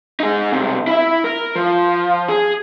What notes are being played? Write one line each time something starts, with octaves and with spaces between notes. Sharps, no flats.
D#4 G#4
B1 C3
E4 E5
A#4
F3
G#4